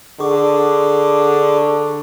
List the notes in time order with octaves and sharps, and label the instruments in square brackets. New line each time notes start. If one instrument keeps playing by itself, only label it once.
[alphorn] D3 [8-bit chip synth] G#4 C#6 D6